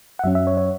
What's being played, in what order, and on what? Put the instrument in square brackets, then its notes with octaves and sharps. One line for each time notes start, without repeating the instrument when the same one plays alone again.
[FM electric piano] F#5
F#2 F#3 C#4 E5
E5
C#5
C#5